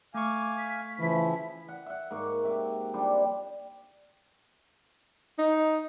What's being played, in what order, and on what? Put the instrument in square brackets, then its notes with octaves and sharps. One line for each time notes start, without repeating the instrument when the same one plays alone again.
[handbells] A3 C#6 [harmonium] F5 G#5 [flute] D6
[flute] B6
[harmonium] C#3 F3 E4 [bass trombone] E3
[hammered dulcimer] F#5
E5 F#5
G#2 A#3 C#6
C3 E5
F3 G3 C4 D4
[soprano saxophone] D#4